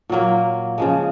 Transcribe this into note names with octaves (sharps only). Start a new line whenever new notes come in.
A#2 F#3 A#3
C#3 F3 G#3